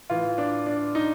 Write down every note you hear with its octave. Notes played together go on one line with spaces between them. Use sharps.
A2 E3 F4
D4
D4
D#4